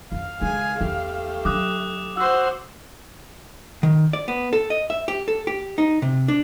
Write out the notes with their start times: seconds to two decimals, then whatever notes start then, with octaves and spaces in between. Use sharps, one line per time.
0.12 F2 F5
0.41 C#3 G#3 G#4 G#5
0.81 E2 A3 G4
1.45 D3 F#3 D6 D#6 F#6
2.17 F#4 C5 F#5 E6
3.83 D#3
4.13 D5
4.28 B3
4.53 A4
4.70 D#5
4.90 E5
5.08 G4
5.28 A4
5.47 G4
5.78 D#4
6.02 C3
6.28 D4